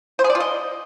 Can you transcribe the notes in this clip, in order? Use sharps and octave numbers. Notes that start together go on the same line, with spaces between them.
C5
G#4
D5
F4
D#5